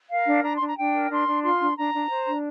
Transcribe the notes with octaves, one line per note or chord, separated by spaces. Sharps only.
A#4 F5
D4
D4 A#5
D4 C6
A#5
D4 G5
A#4
D4 C6
D4
F4 C6
D4
D4 A#5
D4
C5
D4